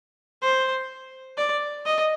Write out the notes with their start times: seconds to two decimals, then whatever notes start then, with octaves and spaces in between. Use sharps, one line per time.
0.42 C5
1.37 D5
1.86 D#5